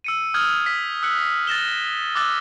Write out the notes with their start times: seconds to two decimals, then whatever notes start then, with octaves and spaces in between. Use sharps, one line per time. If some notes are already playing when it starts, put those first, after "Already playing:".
0.04 E6 C#7 D#7
0.34 D#6 F6 G6 G#6 F#7
0.66 B6
1.03 E6 F#6 C#7 F#7
1.47 A6 A#6 E7 G7
2.15 D6 E6 F#6 A6